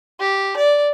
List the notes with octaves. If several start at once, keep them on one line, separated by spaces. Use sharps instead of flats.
G4
D5